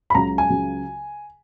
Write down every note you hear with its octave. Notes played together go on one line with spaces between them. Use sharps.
B5
C#2 C#3 F#3 A#5
G#5
C#2 C#3 F#3